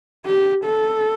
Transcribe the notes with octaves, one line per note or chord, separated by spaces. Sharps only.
G4
A4